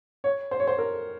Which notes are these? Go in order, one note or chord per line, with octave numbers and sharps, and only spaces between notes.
C#5
C5
C#5
C5
A#4